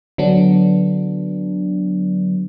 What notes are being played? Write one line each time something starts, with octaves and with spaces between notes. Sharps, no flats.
D3 F#3 B3 D4